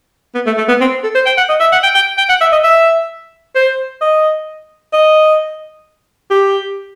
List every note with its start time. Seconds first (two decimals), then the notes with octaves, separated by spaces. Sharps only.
0.35 B3
0.46 A3
0.57 A3
0.68 B3
0.81 C4
1.03 A4
1.15 C5
1.26 G5
1.37 F#5
1.49 D#5
1.60 E5
1.72 F#5
1.83 G5
1.95 G5
2.18 G5
2.29 F#5
2.41 E5
2.52 D#5
2.64 E5
3.55 C5
4.01 D#5
4.93 D#5
6.30 G4